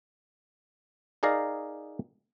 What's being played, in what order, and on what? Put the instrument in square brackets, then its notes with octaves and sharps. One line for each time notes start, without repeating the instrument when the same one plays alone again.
[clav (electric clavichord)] D#4 G#4 A#4 D5 F5 A#5